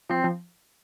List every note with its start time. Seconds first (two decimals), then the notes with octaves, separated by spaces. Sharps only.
0.09 F3 C4
0.24 F3